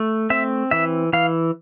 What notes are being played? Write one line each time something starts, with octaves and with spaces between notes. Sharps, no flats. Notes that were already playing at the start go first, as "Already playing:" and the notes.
Already playing: A3
C4 E5
E3 E5
E3 F5